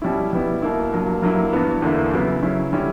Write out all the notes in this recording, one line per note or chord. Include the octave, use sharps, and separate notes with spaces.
B2 G3 C#4 E4
B2 G3 B3 E4
B2 A#3 E4
G2 F#3 A#3
G2 F#3 A#3 E4
G2 E3 B3
E2 D3 A#3 E4
C#3 F#3 B3 E4
C#3 F#3 C#4 E4
D3 G3 C#4 E4